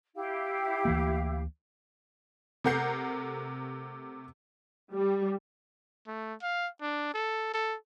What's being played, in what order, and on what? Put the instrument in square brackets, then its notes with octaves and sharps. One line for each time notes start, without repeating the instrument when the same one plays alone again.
[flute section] E4 G4 F5
[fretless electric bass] D2 E3 A#3
[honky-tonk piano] C3 A3 A#4 F#5 G6 C7
[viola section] G3
[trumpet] A3
F5
D4
A4
A4